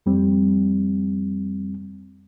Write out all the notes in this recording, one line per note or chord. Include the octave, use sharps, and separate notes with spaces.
F2 G3 C4